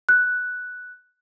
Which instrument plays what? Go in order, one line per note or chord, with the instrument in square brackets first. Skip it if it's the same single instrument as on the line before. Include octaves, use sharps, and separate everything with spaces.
[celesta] F#6